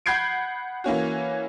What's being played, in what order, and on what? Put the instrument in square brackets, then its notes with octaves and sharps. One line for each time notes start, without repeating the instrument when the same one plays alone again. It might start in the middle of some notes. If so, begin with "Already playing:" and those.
[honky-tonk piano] F#5 B5 G6 G#6 C7 D7
E3 A#3 C#4 F#4